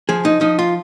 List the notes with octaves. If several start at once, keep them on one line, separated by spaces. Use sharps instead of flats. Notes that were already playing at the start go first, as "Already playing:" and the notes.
F3 G#4
D#4
F3 D#4
F4